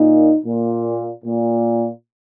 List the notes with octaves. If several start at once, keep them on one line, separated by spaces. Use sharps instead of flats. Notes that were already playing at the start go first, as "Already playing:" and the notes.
Already playing: A#2 D#4
A#2
A#2